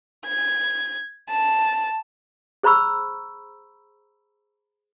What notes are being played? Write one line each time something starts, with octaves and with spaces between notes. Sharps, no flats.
G#6
A5
G#4 C5 A#5 B5 C#6 E6